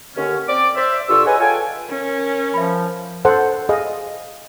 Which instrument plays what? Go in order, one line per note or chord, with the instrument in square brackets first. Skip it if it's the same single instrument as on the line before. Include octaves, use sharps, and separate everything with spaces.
[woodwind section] D#2 D3 C#4
C4 D5 D6
C5 D5 E5
G2 D3 F4 C#6 E6
G#4 B4 C#5 D#5 F#5 G#5
F4 A4 C#5 G5 G#5
[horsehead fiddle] C#4 [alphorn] A#4
[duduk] F3 [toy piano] E5 B5
[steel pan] A4 C5 F#5
G#4 D#5 F5